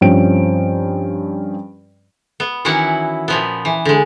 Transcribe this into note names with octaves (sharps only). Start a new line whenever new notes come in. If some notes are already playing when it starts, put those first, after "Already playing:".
G2 F3 C4 C#4 G5 D7
B3
D#3 E3 F#3 C#4 E4 F#5
A#2 F3 B3
E3
D3 G#3